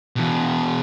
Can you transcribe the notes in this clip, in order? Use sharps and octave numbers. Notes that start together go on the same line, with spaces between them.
E2 B2